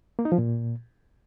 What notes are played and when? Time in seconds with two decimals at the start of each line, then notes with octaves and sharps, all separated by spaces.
0.19 A#3
0.25 D#4
0.32 F3
0.38 A#2